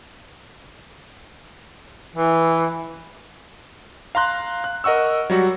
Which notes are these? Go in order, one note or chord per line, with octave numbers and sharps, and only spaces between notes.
E3
F5 A#5 C6 F#6
F#6
A#4 D#5 F#5 C#6 E6
F#3 G3 F#4